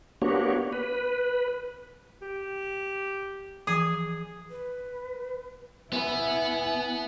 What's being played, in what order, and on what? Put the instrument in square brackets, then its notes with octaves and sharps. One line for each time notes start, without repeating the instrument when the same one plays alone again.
[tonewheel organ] A#3 B3 D4 F#4 G4 C#5
B4
[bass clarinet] G4
[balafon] E3 F3 [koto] G#4
[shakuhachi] B4
[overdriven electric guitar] B3 B4 [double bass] E4 [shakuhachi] G#5